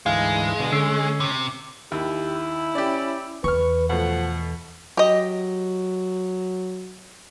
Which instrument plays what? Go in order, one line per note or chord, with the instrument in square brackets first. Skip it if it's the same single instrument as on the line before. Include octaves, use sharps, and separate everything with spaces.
[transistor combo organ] D2 G#2 E3 [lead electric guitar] G#3 [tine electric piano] F5
[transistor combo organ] B2 D3
[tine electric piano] D3 E6 C7 [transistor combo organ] C#4
[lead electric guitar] C3
[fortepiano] D#2 [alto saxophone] E4 [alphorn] G4
[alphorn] C#4 [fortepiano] G4 D5
[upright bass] E2 [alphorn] B4 [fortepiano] C#6 F6
[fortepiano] B2 A3 [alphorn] F3 [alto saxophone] F#5
[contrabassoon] F#3 [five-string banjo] G4 D#5